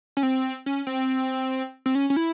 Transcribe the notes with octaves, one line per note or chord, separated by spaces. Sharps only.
C#4
C4
C#4
C4
C4
C#4
C#4
E4